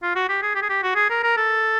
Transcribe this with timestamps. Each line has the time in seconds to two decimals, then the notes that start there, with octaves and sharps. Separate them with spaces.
0.02 F4
0.15 F#4
0.29 G4
0.42 G#4
0.55 G4
0.62 G#4
0.69 G4
0.83 F#4
0.95 G#4
1.10 A#4
1.23 A#4
1.37 A4